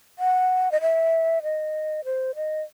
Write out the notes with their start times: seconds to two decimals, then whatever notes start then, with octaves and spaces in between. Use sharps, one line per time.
0.19 F#5
0.72 D#5
0.81 E5
1.43 D#5
2.05 C5
2.36 D#5